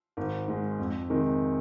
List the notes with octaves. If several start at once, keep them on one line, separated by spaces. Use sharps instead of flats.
G#1
G#2 G#3
F2
C3 D#3 G#3